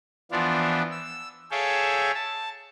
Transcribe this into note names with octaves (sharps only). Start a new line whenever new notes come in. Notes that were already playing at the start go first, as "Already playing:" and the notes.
E3 F3 B3 D4 F4
E6
G#4 A4 C#5 E5 F5 G5
A5